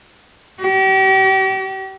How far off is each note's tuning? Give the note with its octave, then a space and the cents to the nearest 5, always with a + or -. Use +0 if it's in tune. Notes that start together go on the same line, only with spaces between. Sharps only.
G4 -40